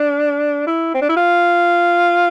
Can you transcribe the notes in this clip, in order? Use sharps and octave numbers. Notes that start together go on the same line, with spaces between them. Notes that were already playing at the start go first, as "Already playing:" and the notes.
Already playing: D4
E4
C4
D4
E4
F4